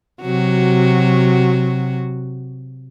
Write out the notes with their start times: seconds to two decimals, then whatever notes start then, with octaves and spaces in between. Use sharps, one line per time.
0.23 C3 F#3 F#4